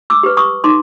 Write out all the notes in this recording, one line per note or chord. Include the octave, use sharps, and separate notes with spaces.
D6 E6
G4 B4
C#6 D#6
D#4 C6 D6